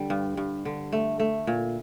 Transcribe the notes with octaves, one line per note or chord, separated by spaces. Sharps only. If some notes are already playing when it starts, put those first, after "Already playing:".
Already playing: D3 G3 D4
G2
G2
D3
A3
A3
A#2